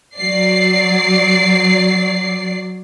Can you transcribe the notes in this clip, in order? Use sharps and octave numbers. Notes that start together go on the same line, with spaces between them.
F#3 D5 C7